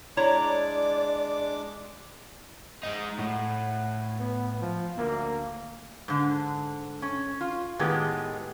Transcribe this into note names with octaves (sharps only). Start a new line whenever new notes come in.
G#3 D4 E4 C#5 D5 A#5 D6
G#3 D#4
A2 F#5
B3
F3
D2 A#3
G#2 D3
C#4
F4
A2 D#3 G#3 B3 G4 G#4